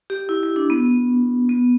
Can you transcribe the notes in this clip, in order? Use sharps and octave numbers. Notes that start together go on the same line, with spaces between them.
G4
E4
E4
D4
B3
B3